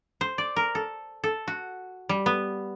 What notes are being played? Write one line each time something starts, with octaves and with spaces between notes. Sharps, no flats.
C5
D5
A#4
A4
A4
F#4
G3
B3